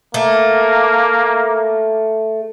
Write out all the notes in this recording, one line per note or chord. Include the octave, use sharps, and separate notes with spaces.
A3 A#3